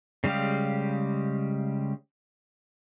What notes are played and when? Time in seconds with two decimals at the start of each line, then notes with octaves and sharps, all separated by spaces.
0.24 C#3 G3 G#3 G4 F5